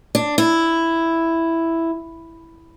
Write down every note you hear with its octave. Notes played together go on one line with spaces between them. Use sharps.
D4
E4